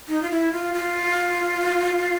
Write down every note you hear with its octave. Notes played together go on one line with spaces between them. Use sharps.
D#4
F4
E4
F4
F4